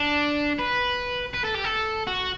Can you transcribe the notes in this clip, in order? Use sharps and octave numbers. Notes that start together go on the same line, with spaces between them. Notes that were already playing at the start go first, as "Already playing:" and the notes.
Already playing: D4
B4
B4
A4
G4
A4
F#4